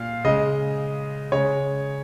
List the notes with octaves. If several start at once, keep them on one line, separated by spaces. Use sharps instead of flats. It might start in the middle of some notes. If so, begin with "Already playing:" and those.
Already playing: A#2 F5
C#3 G#3 D#5
C#3 G#3 C#5